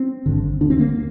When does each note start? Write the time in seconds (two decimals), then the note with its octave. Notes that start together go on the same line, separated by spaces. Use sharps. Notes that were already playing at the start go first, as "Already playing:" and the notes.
Already playing: C4
0.26 G#1 G2 D3
0.61 D2 D3 D4
0.70 C4
0.79 A#3